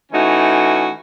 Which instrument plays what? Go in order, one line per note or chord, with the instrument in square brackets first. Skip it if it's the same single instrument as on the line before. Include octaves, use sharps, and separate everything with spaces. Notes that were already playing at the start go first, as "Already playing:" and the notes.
[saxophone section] E3 A3 C#4 D#4 F#4